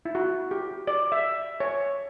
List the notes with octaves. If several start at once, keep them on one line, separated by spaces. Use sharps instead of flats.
E4
F#4
G4
D5
E5
C#5